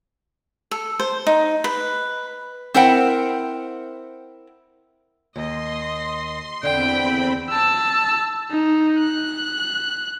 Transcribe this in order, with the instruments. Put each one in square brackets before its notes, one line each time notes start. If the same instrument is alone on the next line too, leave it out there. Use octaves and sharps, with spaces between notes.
[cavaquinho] A4
C5
D#4
B4
[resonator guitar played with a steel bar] C4 E4 A#4 C5 F#5 G5
[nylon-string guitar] D#2 [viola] D#5 [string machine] C6
[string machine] E2 C4 B5 [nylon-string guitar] D3 [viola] G5
[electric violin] A5 E6
D#4
F#6